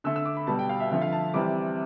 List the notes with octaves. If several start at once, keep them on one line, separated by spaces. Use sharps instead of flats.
D3 A3 E6
E6
D6
B5
B2 G3 A5
G5
F5
E5
D3 F3 A3 E5
F5
A5
C3 E3 G3 D6